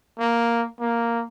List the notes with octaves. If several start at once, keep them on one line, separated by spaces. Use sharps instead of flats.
A#3
A#3